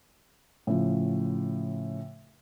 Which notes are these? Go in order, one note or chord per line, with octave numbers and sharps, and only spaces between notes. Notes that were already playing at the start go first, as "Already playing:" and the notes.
A2 C#3 F3